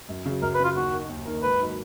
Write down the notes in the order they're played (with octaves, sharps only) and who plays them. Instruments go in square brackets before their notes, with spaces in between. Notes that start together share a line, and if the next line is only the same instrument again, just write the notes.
[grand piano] F#2
C#3 F#3
[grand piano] F#2 [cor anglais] A#4
[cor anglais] B4
[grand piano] C#3 F#3 [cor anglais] F4
[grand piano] D#2 [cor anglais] F#4
[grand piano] D#3 A#3 D#4 A#4
D#2
D#3 A#3 D#4 A#4
[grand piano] G#1 [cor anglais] B4
[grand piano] D#3 F#3 A#3